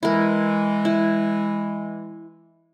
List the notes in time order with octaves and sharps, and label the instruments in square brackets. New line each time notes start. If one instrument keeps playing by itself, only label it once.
[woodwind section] E3 G#3 [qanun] E4 A#4
[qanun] E4